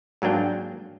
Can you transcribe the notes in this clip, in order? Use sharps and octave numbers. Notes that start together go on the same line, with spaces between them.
G#2 F#3 A#3 D4 G5